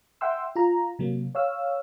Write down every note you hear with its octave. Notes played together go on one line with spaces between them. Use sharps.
E5 F#5 G5 C6 E6
F4 A#5
C3 F#3 A#3
C#5 F5 E6